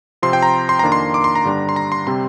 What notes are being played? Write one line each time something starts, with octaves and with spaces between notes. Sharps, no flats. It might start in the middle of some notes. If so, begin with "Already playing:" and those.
C3 F3 C4 C6
G5
A#5
C6
F2 D#3 A#3 D4 A#5
C6
D6
C6
A#5
G2 D3 G3 D4
C6
A#5
C6
C3 G3 C4 C6